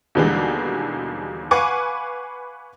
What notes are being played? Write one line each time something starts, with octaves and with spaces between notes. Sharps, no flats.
D#2 B2 D3 E3 G3 G#3
B4 F5 F#5 G#5 C#6 D6